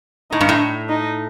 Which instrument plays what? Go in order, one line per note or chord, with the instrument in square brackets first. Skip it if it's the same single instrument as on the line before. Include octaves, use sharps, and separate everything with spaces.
[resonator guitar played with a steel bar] A2 [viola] D#4
[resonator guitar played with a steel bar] G2
A2
[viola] D#4